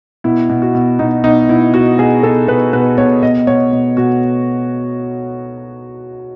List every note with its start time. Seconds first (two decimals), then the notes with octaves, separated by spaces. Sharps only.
0.24 B2 E4
0.49 B2
0.62 F#4
0.75 B2
0.99 B2 D#4
1.24 B2 D#4
1.49 B2 E4
1.74 B2 F#4
1.98 B2 G#4
2.23 B2 A4
2.48 B2 B4
2.73 B2 B4
2.98 B2 C#5
3.22 B2 D#5
3.47 B2 C#5
3.72 B2
3.97 B2 F#4